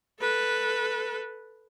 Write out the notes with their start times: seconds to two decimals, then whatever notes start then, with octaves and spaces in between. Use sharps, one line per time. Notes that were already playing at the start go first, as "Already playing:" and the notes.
0.19 A4 B4